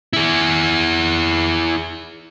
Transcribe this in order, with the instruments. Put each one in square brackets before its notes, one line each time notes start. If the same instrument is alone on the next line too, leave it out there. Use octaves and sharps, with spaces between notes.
[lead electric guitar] E4 G#4